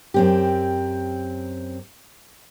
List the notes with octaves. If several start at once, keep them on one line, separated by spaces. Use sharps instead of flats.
F#2 C4 G4